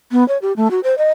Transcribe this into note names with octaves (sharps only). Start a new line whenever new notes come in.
B3
C#5
G4
A3
F#4
C5
D#5